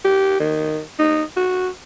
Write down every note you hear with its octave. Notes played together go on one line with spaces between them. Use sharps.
G4
D#3
D#4
F#4